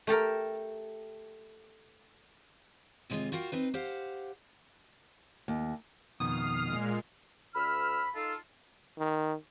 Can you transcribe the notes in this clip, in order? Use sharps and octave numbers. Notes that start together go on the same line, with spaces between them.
A3 G4 A4 A#4
D#2 C3 G#3 C4 F4 D#5
F4 F#4 A#4 F5 G5
C4 D#4 B4
G4 C5 F5 F#5
D#2
F2 B2 D#3 D#6 F6 C7
A#2 G#3
D2 B5 E6 F6
D#4 F4 A4
D#3